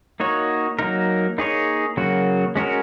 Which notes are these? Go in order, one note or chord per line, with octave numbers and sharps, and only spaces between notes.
A#3 D#4 F#4 C#5
F#3 A#3 D#4 A#4
A#3 D#4 G#4 C#5
C#3 F#3 A#3 F#4
G#3 C#4 F#4 A#4